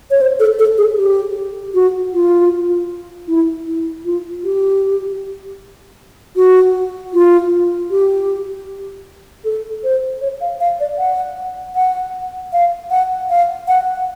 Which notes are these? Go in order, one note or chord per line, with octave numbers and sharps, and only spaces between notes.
C#5
C5
A4
A4
G#4
G4
F#4
F4
E4
E4
F4
G4
F#4
F4
G4
A4
C5
C#5
F5
F5
D5
F#5
F#5
F5
F#5
F5
F#5